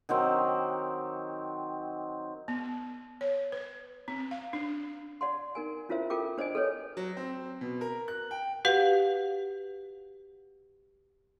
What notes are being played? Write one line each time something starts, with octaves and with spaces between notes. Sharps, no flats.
D#3 F#3 C4 D#4
B3
C#5
B4
C4
F5
D4
D5 F#5 C6
D#4 A#4 G#5
C#4 E4 F4 A#4 C5 E5
F4 A4 A#4 G5 D6
D4 C5 D5 D#5 G#5
A4 B4 C#5
F#3
C4
B2
A#4
F#6
G5
F#4 G4 B4 F5 F#5